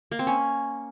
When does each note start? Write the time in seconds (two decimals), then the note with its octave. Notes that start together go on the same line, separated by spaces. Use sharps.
0.11 A#3
0.19 C4
0.27 C#4